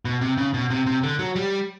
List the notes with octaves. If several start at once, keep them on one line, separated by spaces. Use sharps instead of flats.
B2
C3
C#3
B2
C3
C3
D3
F#3
G3